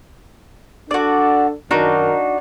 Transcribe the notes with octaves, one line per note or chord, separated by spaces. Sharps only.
D4 F#4 A4 D5
F#2 D#3 D4 D#4 F#4 A#4